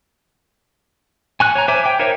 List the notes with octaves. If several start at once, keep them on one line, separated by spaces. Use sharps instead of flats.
G#5 C#6 F#6
C#5 G#5 A#5
C5 C#5 E5 G#5 D6
G5 D6
D#4 A#4 C5 C#5 E5